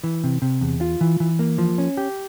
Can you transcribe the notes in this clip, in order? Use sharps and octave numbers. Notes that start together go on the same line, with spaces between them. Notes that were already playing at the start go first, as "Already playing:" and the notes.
E3
C3
C3
E2
F4
E3
E3
A#3
F3
C#4
G4